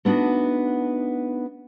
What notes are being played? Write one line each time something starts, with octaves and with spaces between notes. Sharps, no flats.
A3 B3 D4 D#4 F#4